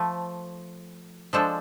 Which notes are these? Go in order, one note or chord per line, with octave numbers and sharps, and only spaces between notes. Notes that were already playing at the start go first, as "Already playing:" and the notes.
Already playing: F3 A3
F3 G#3 D4 A4 C5